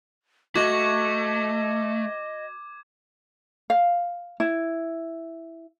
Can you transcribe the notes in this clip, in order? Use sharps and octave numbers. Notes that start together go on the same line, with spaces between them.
A3 F#4 D#5 D6 G#6
F5
E4